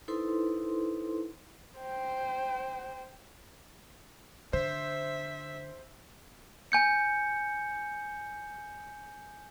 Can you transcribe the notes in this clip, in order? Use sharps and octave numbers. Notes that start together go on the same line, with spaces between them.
D#4 E4 A4 B4 C5 C6
C5 G5
D3 C5 E5
G#5 G6 C#7